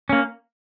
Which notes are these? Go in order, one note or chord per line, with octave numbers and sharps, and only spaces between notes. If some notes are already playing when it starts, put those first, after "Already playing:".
A#3 C#4